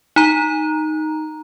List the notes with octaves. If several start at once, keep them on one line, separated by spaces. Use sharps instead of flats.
D#4 A#5